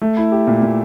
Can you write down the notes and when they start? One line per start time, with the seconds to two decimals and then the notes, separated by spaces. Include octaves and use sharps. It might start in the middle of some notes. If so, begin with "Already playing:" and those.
0.02 A3
0.17 E4
0.32 G4
0.47 A#2
0.62 A#2